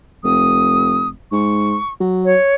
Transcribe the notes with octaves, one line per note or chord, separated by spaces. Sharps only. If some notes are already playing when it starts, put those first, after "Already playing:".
F1 D#6
G#2 C#6
F#3
C#5